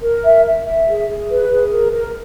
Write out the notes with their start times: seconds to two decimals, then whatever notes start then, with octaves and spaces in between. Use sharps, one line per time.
0.02 A#4
0.24 E5
0.45 E5
0.66 E5
0.87 G#4
1.08 G#4
1.30 B4
1.50 G#4
1.72 A#4
1.92 A#4